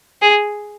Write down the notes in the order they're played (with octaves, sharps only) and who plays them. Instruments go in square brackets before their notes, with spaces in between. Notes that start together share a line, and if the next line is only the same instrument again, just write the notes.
[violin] G#4